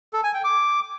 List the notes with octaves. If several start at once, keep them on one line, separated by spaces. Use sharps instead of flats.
A4
G#5
G5
D6